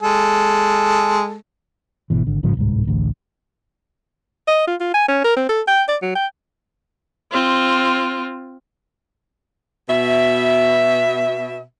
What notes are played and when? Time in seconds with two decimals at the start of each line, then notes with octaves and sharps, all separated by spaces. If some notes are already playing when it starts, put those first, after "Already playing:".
0.02 G#3 A4
2.10 G#1 B2 E3
2.27 G#1 D3
2.43 A1 G#2 C#3 F3
2.57 D1 C2 G#2
2.87 A1 D2
4.47 D#5
4.67 F4
4.80 F4
4.94 G#5
5.08 C#4
5.24 A#4
5.36 C4
5.49 A4
5.67 G5
5.88 D5
6.02 F#3
6.15 G5
7.31 C4 F4
9.87 B2 E5